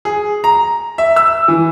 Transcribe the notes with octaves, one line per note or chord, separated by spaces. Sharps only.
G#4
A#5
E5
E6
E3